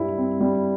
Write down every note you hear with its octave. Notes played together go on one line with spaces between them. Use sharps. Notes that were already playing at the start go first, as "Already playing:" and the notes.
Already playing: G2 G3 E4
C4
G3